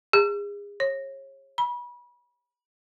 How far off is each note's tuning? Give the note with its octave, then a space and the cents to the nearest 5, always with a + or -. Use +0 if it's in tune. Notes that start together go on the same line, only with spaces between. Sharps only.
G#4 -35
C#5 -30
B5 -30